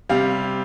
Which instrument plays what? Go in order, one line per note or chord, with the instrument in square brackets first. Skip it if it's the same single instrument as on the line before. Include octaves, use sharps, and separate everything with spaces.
[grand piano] C3 G3 F5